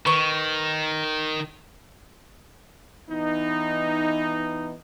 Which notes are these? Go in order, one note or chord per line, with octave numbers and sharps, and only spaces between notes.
D#3 B4 C#6
E3 B3 D#4